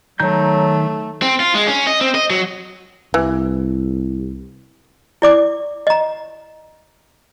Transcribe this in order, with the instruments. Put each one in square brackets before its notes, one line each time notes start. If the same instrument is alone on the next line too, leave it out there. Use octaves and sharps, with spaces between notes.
[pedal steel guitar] D#3 A#5 G6 [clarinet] F#3 [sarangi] A3
[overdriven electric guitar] C4
F4
G#3
C#4
D#5
C4
D#5
F#3
[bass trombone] C2 [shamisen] E3
[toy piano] E4 D5 D6
D#5 A#5